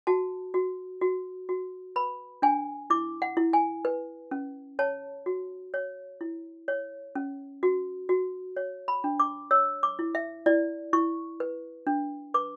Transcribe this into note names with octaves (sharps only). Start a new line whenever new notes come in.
F#4 A5
F#4
F#4
F#4
B4 B5
D4 G#5
E4 D6
F#5
E4
G#5
B4
C#4
C#5 A5
F#4
C#5
E4
C#5
C#4
F#4
F#4
C#5
B5
D4
D6
C#5 E6
D6
E4
E5
E4 D5
E4 C#6
B4
D4
B4 D6